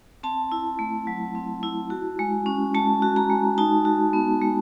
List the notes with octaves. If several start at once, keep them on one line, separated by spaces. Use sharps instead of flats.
C4 A5
E4
A3
F#3
C4
E4
F#4
G#3
C#4
G#3 A5
F#4
A#5
G#3
D#4 A5
F#4
B3
G#3